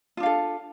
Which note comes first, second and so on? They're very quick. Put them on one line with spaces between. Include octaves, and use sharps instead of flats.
F4 D4 F5 A4